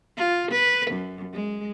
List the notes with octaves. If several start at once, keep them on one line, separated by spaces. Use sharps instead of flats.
F4
B4
F#2
G#3